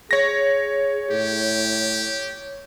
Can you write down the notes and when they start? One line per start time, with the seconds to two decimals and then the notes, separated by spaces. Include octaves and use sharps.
0.11 G#4 C#5 A#6
1.11 A2 G4